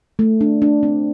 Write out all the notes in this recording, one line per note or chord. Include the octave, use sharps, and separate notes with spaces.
A3
D4
D4
C4